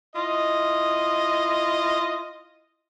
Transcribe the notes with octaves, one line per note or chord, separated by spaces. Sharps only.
E4 F4 D#5